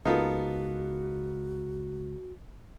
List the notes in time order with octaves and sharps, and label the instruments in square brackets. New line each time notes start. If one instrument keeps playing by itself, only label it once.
[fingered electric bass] C#2 [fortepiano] A#3 B3 A4 [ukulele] D#4 F4 [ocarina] F#4